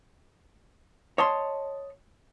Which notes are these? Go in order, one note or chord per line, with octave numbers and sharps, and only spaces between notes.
C#5 D#5 A5 C6